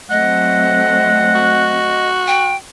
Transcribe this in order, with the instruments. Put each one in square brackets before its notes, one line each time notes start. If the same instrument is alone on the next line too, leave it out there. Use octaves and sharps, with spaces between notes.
[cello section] F#3 A3 C4 [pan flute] D#5 [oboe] F#5
[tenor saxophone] F#4
[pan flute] G5